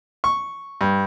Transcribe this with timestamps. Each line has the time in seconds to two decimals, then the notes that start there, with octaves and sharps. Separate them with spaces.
0.24 C#6
0.81 G2